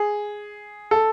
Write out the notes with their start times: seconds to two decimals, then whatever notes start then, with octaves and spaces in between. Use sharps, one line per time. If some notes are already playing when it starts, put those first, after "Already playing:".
Already playing: G#4
0.91 A4